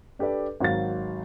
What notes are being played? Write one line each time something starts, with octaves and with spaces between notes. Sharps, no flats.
D4 G4 A4 B4 D5
G#1 F#3 F5 A6